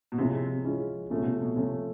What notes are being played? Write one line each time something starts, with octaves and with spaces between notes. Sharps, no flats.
B2
C3 F3 G#3 C#4 E4
F3 G#3 C#4 E4
C3 F3 A3 C#4
B2
C3
B2
C3 F3 A3 C#4